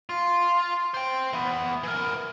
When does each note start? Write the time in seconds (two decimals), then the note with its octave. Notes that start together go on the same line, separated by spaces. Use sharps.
0.09 F4
0.94 C5 G5
1.33 E3 B3
1.84 E3 A#4